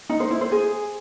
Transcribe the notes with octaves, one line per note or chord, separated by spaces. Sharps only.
D#4
C5
E4
C5
G#4